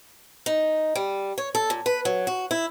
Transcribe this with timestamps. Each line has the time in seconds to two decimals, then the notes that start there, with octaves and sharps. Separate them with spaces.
0.46 D#4
0.95 G3
1.38 C#5
1.55 A4
1.70 A#2
1.86 B4
2.05 F#3
2.27 F#4
2.51 E4